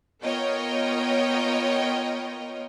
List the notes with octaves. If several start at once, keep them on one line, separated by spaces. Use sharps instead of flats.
B3 F4 A#4 C#5 D#5 G5